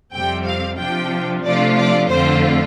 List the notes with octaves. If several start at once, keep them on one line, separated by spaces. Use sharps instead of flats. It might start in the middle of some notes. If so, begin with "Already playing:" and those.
F2 C3 G3 C4 G5
F5
C3 F3 D4 F4 G5
C3 F3 A3 D4 F4 D5
D5
F2 D3 A3 C4 F4 C5